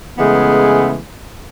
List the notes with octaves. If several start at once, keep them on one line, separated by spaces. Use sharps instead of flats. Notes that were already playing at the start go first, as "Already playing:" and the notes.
C#3 E3 G#3 A3 B3